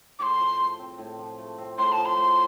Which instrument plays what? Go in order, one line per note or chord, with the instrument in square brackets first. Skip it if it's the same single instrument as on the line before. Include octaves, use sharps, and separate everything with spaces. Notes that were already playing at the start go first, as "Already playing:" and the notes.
[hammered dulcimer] A2 [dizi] C6 D6
[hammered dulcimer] F3
A3
C4
A2
F3
A3
C4
[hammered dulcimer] A2 [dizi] C6
[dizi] A5
[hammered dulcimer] F3
[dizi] C6
[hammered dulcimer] A3